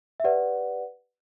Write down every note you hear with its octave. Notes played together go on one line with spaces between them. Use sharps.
E5
G4 B4 D5 F#5